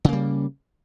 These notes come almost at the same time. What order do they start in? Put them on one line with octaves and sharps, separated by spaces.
C#3 A#3 G3